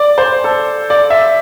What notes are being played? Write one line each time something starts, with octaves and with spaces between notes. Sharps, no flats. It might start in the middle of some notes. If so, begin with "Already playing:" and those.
Already playing: D5
C5
A4
D5
E5